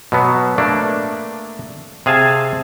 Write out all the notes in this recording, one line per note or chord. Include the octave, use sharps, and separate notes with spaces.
B2 F#3 B3
A3 A#3 D4
C3 G#4 F5 G#5 A5